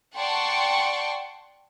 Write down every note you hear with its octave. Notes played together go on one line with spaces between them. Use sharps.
D5 F#5 G5 A5 C6 C#6